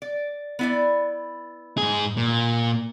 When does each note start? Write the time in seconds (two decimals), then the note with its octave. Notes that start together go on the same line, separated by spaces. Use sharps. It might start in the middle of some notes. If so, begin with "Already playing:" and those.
0.02 D5
0.59 B3 E4 D5
1.78 G#2 G#4
2.17 A#2